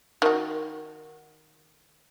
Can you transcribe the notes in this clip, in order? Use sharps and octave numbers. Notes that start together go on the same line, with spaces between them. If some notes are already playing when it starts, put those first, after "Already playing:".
D#3 F#4